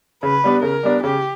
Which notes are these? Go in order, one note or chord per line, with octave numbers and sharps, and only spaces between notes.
C#3 B4
G3 B3 D4
C#3 A#4
G3 B3 D4
C#3 G4